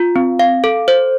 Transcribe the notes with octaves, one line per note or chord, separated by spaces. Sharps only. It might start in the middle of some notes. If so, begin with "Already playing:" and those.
Already playing: F4
C4
F5
A4
C5